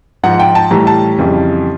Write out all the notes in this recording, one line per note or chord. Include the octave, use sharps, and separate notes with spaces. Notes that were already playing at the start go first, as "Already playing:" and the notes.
G#2 F3 F#5
G5
A5
A2 E3 G3 A#5
A5
F2 C#3 E3 G3